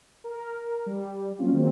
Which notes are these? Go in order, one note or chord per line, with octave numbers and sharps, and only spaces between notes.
A#4
G3
F#3 A#3 C4 C#4 F4
D#3 F#3 G#3 A#3 C4